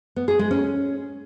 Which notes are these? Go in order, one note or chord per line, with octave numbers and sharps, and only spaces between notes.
B3
G#4
G#3
C#4